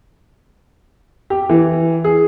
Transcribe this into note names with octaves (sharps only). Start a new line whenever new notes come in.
G4
E3
G#4